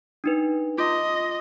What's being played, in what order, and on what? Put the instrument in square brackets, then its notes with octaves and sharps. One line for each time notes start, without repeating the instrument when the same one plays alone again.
[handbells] D4 D#4 B4
[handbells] F4 C6 D6 [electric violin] D#5